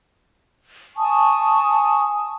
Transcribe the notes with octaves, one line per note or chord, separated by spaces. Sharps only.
G#5 A5 C#6 D#6